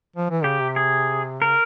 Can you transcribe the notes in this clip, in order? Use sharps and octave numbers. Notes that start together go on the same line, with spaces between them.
F3
E3
C#3 G4
C3
G#4
C#3 A#4